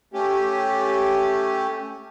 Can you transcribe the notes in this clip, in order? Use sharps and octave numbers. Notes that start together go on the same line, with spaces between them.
A3 C#4 G4